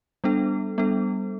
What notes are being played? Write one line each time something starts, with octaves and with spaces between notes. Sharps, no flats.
G3 B3 D4 A4
G3 B3 D4 A4